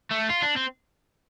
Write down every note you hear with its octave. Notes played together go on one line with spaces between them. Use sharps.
A3
F4
D4
C4